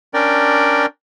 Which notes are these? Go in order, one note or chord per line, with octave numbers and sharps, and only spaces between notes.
C#4 D4 A#4 D5 G5